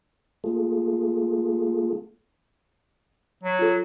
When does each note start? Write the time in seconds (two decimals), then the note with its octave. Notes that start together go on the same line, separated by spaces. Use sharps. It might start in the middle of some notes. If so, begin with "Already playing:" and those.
0.44 A3 A#3 F4 G#4 A4
3.43 F#3
3.59 F4 A4